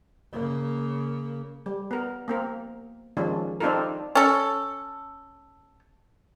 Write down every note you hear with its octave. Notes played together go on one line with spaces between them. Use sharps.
C#3 A#3
G3
B3 A#4
A#3 C4 A#4
D#3 F3 G#3 C#4 D4
C4 D4 D#4 F4 A4 A#4
C#4 A4